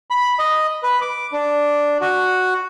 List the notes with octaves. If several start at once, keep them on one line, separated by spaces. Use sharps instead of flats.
B5
D#5
B4
D6
D4
F#4